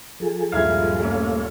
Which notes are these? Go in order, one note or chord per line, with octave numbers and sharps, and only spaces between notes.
F3 G#4 A4
D#1 G2 G#3 E4 F5 G#6
A3 A#3 C#4 A4 C#5 F5